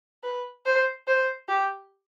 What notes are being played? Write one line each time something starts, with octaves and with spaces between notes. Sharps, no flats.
B4
C5
C5
G4